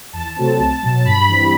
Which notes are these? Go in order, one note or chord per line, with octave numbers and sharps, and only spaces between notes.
E2 A5
C3 F#3 A3 C4
C2
B2 F#3
G2 B5
E3 G3 C4